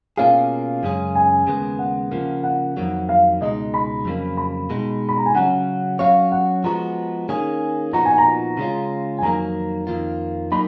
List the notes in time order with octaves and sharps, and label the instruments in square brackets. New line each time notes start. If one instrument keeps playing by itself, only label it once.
[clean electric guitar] B2 A#3 C#4 F4 G#4 [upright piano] F5
[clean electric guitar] F#2 C#3 G#3 C#4 G#4
[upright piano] G#5
[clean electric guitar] D#2 C#3 G#3 B3
[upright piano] F#5
[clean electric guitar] C#3 F3 A#3
[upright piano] F#5
[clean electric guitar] F2 D#3 F#3 A#3
[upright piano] F5
[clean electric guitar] C#2 B2 G#3 D#4 [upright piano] D#5
[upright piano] B5
[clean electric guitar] F2 C#3 F#3 A#3
[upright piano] B5
[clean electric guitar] B2 G#3 D#4
[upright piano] B5
A#5
G#5
[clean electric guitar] C#3 F#3 C#4 [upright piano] F#5
[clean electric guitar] F#3 C#4 F#4 C#5 [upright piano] F5
[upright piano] F#5
[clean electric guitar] F3 G#3 B3 F#4 [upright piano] A#5
[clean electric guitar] D#3 A#3 C#4 G#4
[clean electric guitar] A#2 F3 B3 D#4 F#4 [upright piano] A#5
[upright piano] G#5
A#5
[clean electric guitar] C#3 G#3 C#4 F4
[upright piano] G#5
[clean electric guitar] F2 D#3 F#3 A#3 [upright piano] A#5
[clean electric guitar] F2 D#3 A#3 F4
[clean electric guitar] F#3 A#3 D#4 A#4 [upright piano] B5